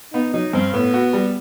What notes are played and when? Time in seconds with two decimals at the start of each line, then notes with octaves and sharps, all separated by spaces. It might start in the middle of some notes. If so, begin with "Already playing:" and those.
0.13 B3 D#4
0.34 F#3 D#4
0.53 G2 C4
0.73 A2 B3
0.94 F#4
1.13 G3